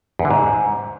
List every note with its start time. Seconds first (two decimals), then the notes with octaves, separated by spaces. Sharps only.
0.19 E2
0.25 D3
0.31 G#2